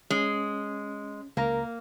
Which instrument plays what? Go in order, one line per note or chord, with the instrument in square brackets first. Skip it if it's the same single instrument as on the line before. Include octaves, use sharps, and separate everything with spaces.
[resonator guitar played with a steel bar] G#3 [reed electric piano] C#4
[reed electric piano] C#2 A#4 A#5 [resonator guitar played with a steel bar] A#3